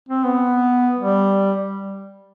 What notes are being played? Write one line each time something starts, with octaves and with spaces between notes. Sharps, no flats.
C4
B3
G3